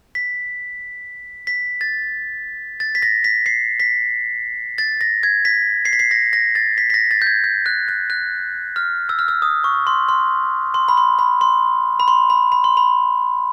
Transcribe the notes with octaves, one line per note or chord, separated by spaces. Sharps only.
B6
B6
A6
A6
B6
A#6
B6
C7
B6
A6
A#6
G#6
B6
C7
B6
C7
A#6
A#6
A6
B6
B6
A#6
A6
G6
G#6
G6
F#6
F#6
F#6
F6
E6
F6
E6
D#6
C#6
C6
C6
C6
B5
C6
B5
C6
B5
C6
B5
B5
C6
B5